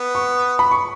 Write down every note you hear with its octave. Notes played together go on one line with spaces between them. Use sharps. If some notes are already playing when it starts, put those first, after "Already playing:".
Already playing: B3
C#6
B5
C#6